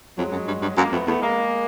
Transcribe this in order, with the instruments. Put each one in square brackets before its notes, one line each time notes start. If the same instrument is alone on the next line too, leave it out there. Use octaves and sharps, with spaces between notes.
[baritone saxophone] F2 [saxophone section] F#3 G#3
[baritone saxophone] F#2
G2
G2
[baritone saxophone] F#2 [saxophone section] G#3 A#3
[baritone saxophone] F2 [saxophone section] A3 B3
[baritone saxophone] E2 [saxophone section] A3 B3
[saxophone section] G#3 A#3